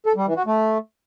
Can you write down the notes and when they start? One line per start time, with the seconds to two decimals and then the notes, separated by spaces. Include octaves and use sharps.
0.06 A4
0.16 G3
0.26 E3
0.36 F#4
0.46 A3